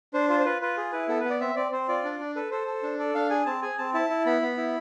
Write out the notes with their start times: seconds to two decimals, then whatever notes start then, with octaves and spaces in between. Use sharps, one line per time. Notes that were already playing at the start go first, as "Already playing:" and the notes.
0.14 D4 C5
0.29 F4 C5
0.40 C5
0.45 F4 B4
0.62 F4 B4
0.77 G#4
0.92 E4 B4
1.08 B3 A4
1.20 B4
1.25 B3
1.30 D5
1.41 C4 E5
1.56 C4 D5
1.72 C4 C5
1.88 F4 D5
2.04 D4
2.20 D4
2.36 A4 B4
2.51 A4 C5
2.67 A4
2.83 D4
2.99 A4 D5
3.15 D4 F5
3.30 G#4 G#5
3.46 C4 A5
3.62 G#4 G#5
3.78 C4 A5
3.94 E4 A5
4.10 E4
4.26 B3 B5
4.42 B3
4.57 E4